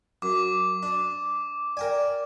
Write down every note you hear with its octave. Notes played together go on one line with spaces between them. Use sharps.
F#2 D6
D4
A#4 D5 G5 G#5